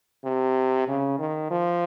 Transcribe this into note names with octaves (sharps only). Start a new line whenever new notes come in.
C3
C#3
D#3
F3